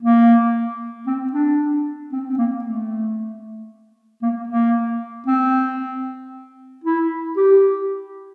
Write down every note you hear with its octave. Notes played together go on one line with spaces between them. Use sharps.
A#3
C4
D4
C4
C4
A#3
A3
A#3
A#3
C4
E4
G4